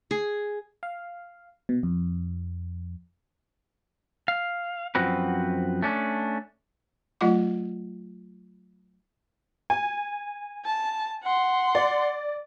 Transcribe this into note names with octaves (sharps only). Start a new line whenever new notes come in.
G#4
F5
B2
F2
F5
F#2 F3 C4 F#4 B4
A3 C#4 D4
F#3 A3 F4 D#5 F#5 D6
G#5
A5
F#5 C6
D5